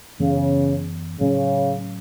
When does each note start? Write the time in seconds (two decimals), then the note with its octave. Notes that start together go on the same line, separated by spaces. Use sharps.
0.19 F#2 C#3 E3 B3
1.20 A2 C#3 F#3 C#4